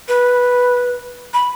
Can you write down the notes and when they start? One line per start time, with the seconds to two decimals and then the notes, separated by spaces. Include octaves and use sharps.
0.08 B4
1.34 B5